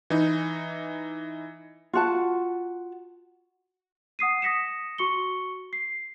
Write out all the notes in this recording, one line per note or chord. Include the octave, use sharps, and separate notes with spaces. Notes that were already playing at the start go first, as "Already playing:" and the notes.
E3 D#4
F4 F#4 A5
F#5 D#6 C7 D#7
D#6 A#6 B6 C#7 E7
F#4 C#6 C#7 G7
C7